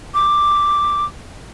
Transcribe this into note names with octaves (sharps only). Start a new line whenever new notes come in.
D6